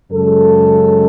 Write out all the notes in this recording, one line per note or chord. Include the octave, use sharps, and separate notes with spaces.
F#2 C#3 G#3 A4